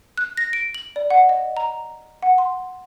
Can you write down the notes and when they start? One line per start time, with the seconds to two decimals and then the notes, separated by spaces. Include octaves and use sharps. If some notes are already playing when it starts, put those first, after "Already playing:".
0.18 F#6
0.37 A#6
0.53 D7
0.75 F#7
0.96 D5
1.10 F#5
1.29 D#5
1.57 A#5
2.22 F#5
2.38 C6